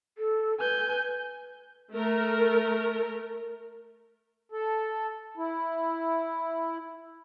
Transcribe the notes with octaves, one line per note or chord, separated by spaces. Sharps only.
A4
B4 G#5 G6
A3 A#4
A4
E4